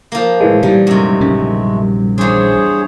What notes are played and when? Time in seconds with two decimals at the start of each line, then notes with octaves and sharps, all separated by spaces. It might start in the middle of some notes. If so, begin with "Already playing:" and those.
0.12 F3 A#3
0.41 A2 E3 G#3
0.63 A#2 E3 G3 D#4
0.87 F#2 C3 G#3 A3
1.20 A#1 C#3 C#4
2.18 E2 D4 G#4 C5 C#5